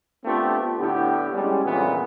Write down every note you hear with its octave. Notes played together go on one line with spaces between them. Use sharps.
A3 B3 C4 D4 F4 G4
A2 D3 B3 G4
G3 G#3 C#4
A#1 F2 A#2 C#3 E3 B3